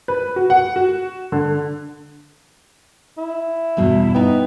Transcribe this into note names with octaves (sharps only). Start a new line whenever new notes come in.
B4
F#4
F#5
F#4
D3
E4
E2 G2 B2
B3 D#4 G5